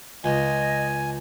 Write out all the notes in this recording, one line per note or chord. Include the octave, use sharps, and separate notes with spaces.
C#2 D#5 G#5